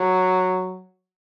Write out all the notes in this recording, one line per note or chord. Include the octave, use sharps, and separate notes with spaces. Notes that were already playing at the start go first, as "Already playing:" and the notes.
Already playing: F#3